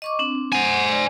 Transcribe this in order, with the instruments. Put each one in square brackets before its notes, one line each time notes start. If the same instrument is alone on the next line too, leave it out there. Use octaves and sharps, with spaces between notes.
[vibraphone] D#5 C#6 D6
C4 D4
[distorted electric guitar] C5 G#5 [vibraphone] F#5
[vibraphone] D5